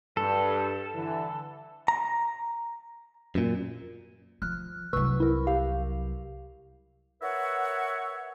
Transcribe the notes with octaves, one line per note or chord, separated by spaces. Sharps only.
G2 A4
D3 E3
A#5
F#2 A#2
F3 F6 F#6
C2 F#3 B4 C#6 E6
E4 A#4
G4 F5
A#4 B4 C#5 E5 F#5